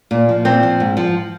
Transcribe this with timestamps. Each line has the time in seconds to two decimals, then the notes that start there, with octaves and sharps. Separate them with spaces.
0.11 A#2
0.29 F3
0.45 A#2 C4
0.63 F3
0.80 G#2
0.97 F3